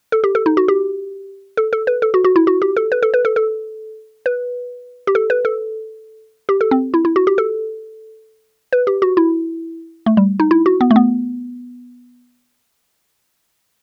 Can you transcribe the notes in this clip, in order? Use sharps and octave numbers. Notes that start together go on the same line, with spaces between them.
A4
G4
A4
D#4
F#4
G4
A4
A4
B4
A4
F#4
F#4
E4
F#4
G4
A4
B4
A4
B4
A4
A4
B4
G4
A4
B4
A4
G4
A4
C4
E4
E4
F#4
G4
A4
B4
G4
F#4
E4
A3
G3
D#4
E4
F#4
B3
A3
B3